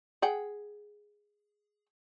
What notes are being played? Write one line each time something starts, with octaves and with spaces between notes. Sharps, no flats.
G#4 F#5 G5